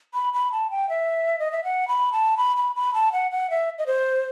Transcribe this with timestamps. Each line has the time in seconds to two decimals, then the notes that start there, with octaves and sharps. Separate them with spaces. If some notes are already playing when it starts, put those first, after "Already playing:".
0.14 B5
0.34 B5
0.52 A5
0.71 G5
0.89 E5
1.39 D#5
1.52 E5
1.64 F#5
1.88 B5
2.13 A5
2.37 B5
2.57 B5
2.76 B5
2.94 A5
3.12 F#5
3.31 F#5
3.50 E5
3.78 D#5
3.87 C5